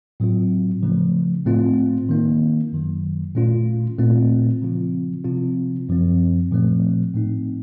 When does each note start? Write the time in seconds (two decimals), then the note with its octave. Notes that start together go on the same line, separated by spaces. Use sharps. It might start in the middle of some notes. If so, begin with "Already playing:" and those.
0.20 A2 F#3 C4 F4
0.83 C#3 F3 A3 C#4
1.46 A2 A3 C4 F4
2.09 D#3 A#3 D#4
2.72 F#2 D#3 F#3
3.35 A#2 A3 C#4 F4
3.99 A#2 A3 C4 F4
4.62 C#3 F3 C4 F4
5.24 C3 F3 C4 F4
5.89 F#2 F3 C4
6.51 A#2 F3 A3 C4
7.14 A2 A3 C4 D#4